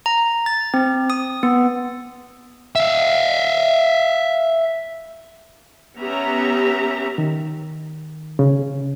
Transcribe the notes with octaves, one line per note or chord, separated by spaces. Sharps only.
A#5
A6
C4
D#6
B3
E5 F5
B3 C#4 G4 E5 A#5
D#3
C#3